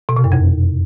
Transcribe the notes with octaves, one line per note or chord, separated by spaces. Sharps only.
B2
C3
F#2
F2